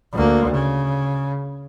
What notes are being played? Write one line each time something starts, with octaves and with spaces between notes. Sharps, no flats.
D2 A#3
C#3